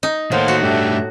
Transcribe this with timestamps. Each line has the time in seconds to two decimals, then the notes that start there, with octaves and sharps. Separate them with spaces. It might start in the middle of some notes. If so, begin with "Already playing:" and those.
0.03 D#4
0.32 A2 D#3 A#3 C5 F5 F#5
0.48 F#4
0.62 G2 A3 D4 G4 E5